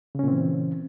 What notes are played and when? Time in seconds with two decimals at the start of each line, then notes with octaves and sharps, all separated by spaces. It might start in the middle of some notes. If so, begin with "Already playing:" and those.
0.15 C#3
0.19 C#4
0.24 A#2
0.28 C4
0.32 E3